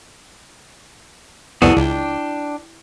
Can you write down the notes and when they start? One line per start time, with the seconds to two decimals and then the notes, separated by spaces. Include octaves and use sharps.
1.62 C2 F2 B3 E4 F#4 G#4 A4 D5
1.77 C#2 D4 G5